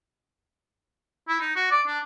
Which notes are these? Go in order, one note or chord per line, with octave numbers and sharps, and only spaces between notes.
E4
D#4
F#4
D5
D4